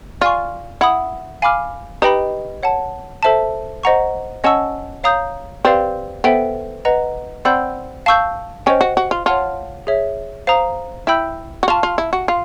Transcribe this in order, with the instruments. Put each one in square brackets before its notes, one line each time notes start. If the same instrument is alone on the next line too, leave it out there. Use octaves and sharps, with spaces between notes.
[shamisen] F4 [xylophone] D5 F5 G#5 C#6
[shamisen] E4 [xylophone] F#5 B5 D#6
[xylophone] F5 G#5 B5 D6 F6
[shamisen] D#4 [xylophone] G4 B4 D#5 G5 B5
[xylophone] C#5 F#5 A5
A4 C5 E5 A5
C5 D#5 F#5 A#5 C#6
[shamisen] C#4 [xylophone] D#5 F#5 A5 C#6 E6
[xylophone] C#5 F5 A#5 D#6 G6
[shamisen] C4 [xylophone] G4 B4 D5 F5
[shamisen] B3 [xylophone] A4 C5 E5 G5
[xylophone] B4 D#5 F#5 A#5
[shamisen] C4 [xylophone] D5 F#5 B5 E6 G6
[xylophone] F5 A5 C#6 E6 G6
[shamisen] C#4 [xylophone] C5 D#5 G5
[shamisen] F#4
F#4
F4
[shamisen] F4 [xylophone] C#5 F#5 A5
[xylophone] G#4 C#5 E5
C5 F5 A#5 D#6
[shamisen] E4 [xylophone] E5 G5 B5 E6 G6
[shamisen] F#4
[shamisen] F4 [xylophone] F5 A5 C#6 F6
[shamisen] F4
E4
F#4
[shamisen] F4 [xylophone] F5